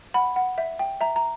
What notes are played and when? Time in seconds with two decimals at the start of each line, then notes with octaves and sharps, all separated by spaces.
0.14 F#5 B5
0.36 F#5
0.58 E5
0.79 G5
1.01 E5 A#5
1.16 A#5